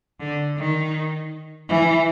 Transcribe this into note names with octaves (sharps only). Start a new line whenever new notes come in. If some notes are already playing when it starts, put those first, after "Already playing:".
D3
D#3
E3